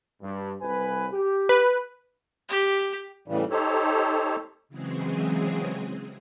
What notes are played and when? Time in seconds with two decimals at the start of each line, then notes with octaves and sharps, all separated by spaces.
0.21 G2
0.61 C2 B4 G#5
1.11 G4
1.49 B4
2.49 G4
3.28 A2 C#3 E3 G3
3.51 D#4 G4 A4 C5 C#5
4.69 C#3 E3 F#3 G#3 C4 G#4